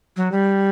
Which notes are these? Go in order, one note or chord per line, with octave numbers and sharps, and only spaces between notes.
F#3
G3